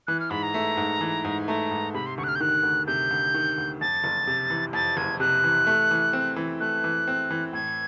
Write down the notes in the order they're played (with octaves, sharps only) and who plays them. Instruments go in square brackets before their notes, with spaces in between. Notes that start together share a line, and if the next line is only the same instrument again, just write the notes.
[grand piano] E3 [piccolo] F#6
[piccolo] F6
[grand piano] G#2 [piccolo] B5
[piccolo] A#5
[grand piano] A3
G#2
E3
G#2
[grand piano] A3 [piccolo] A#5
[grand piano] G#2
[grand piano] C3 [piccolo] B5
[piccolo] C6
[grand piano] D2 [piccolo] C#6
[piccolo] F#6
F6
G6
[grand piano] D#3 [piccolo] F#6
[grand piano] D2
[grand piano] C3 [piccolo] G6
[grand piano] D2
D#3
D2
[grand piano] F2 [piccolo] A6
[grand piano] F#1
C3
E3
[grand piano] F2 [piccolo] A6
[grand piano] F#1 [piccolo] G#6
[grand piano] C3 [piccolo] F#6
[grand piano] E3
A3
E3
C4
E3
[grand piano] A3 [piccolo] F#6
[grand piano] E3
C4
E3
[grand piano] A2 [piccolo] G#6